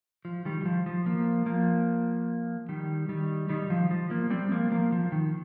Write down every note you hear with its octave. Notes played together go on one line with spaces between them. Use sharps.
F3
D#3 G3
D#3
F3
F3
F3 A#3
F3 A#3
D#3 G3
D#3 G3
D#3 G3
F3
F3
F3 A#3
G3 C4
F3 A#3
F3 A#3
F3
D#3